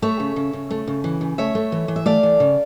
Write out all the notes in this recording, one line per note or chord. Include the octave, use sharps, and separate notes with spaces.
A3 C#5 E5
C#3
C#3
C#3
A3
C#3
E3
C#3
A3 C#5 E5
A3
E3
E3
E5
A3 D5 F5
E3
C#3